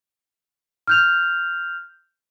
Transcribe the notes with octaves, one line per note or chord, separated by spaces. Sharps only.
F6 G6 F7